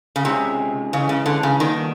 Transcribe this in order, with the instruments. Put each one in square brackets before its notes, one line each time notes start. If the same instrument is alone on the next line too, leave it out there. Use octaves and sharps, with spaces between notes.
[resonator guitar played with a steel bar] C#3
[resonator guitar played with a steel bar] C3 [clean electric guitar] D#3 G#3 C#4 F4 G#4
[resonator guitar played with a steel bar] C#3 [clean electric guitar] E3 G#3 C#4
[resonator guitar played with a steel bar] C#3
D3
C#3
[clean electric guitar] A#2 G3 B3 D4 [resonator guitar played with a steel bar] D#3